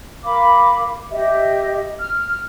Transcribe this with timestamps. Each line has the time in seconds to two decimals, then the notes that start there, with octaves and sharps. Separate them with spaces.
0.24 A#4 F5 B5 D6
1.12 G4 D#5 E5
1.99 F6